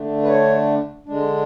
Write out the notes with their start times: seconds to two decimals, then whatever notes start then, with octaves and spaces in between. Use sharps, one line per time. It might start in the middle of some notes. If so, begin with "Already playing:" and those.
Already playing: D3 A3 D4
0.23 B4
0.28 C#5
1.06 D3 G#3 D4